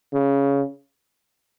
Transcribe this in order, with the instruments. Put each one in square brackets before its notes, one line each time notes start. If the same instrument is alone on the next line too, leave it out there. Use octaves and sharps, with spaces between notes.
[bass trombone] C#3